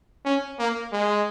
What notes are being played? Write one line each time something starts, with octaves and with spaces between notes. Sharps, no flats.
C#4
A#3
G#3